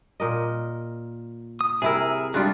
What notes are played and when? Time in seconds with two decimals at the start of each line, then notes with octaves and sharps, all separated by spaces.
0.20 A#2 A#4 D#5
1.61 D#6
1.82 C3 E4 G#4 A#4 E6
2.34 G3 G#3 D4 F4 F#4